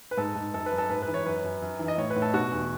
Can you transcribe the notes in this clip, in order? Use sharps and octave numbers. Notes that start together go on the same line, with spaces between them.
B4
G#2 A4
G#2
F#2 A4
B4
F#2
A4
G#2 B4
B4
E3
C#5
F#2 B4
F#2
F#2
E3
D#5
A2 C#5
B4
A2
A4
B2 F#4
E2